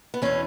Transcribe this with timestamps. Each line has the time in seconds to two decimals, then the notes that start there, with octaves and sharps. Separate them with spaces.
0.14 B3
0.22 E2 B2 C#4